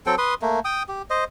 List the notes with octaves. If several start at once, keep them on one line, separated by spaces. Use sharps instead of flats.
F#3 C4 A4 G5
B4 C6 D#6
A3 A#3
G5 D#6
G4
C5 D#5